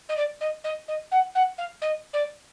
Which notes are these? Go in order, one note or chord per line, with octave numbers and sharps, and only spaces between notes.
D#5
D5
D#5
D#5
D#5
F#5
F#5
F5
D#5
D5